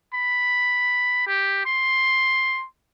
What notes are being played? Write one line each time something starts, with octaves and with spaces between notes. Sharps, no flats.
B5
G4
C6